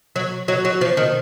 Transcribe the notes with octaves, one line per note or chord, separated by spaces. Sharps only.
F#3
F#3
F#3
F3
D#3